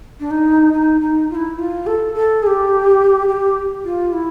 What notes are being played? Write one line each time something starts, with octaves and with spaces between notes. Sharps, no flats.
D4
D#4
D#4
D#4
F4
E4
F4
A4
A4
G#4
G4
G4
F4
E4